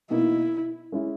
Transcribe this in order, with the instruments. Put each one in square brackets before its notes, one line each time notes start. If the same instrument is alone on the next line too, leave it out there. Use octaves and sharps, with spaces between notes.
[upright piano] B2 A#3 D#4 [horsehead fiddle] E4
[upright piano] G#3 C#4 E4